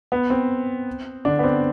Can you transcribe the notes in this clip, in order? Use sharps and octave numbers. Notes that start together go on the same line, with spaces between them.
B3
C4
D3 D4
B3
C4